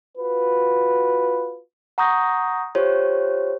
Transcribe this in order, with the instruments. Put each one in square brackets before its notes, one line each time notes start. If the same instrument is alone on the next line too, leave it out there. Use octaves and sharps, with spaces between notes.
[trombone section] F4 F#4 B4
[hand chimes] F#5 A#5 C#6 D#6 G6 A#6
F4 G4 C5 C#5